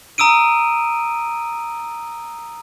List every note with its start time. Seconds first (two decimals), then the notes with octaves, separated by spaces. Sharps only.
0.18 A#5 D#6 E6 D7 D#7